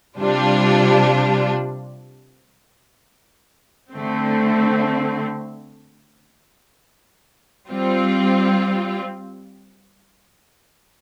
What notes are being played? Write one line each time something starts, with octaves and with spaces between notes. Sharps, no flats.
C3 G3 D4 F4
D3 A3 C4
G3 C4 F4